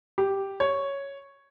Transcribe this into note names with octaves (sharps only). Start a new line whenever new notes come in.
G4
C#5